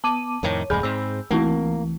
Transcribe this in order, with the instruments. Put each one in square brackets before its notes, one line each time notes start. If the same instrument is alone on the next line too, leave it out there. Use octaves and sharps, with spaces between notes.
[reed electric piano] B3 [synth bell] A5 D6 D#7
[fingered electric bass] F2 A2 D#3 [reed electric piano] C#5
[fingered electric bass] D1 F2 G#3 [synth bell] G#4 G#5 B5 [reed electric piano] G6
[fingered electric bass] G#2 C4 [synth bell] E6
[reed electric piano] C#2 E3 [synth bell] A3 C4 E4 [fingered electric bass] A#3